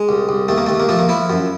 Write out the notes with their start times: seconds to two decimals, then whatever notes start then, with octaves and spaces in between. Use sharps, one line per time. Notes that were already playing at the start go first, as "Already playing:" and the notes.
Already playing: G#3
0.09 C2
0.29 C2
0.48 D#2 A3
0.58 A#3
0.66 D#2 A3
0.80 A#3
0.89 F3 A3
0.99 A#3
1.09 F3 E4
1.30 F#2